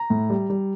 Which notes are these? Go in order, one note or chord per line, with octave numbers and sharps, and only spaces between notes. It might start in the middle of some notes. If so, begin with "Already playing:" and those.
Already playing: A#5
A2
G3
G3